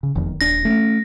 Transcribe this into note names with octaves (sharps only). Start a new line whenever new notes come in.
C#3
F1 E2 D#3
D#1 D4 A#6
A3 C#4